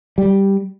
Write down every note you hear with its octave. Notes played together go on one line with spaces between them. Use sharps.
G3